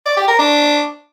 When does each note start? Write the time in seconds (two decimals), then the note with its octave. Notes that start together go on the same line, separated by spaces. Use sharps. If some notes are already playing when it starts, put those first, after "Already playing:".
0.06 D5
0.17 G4
0.28 A#4
0.39 D4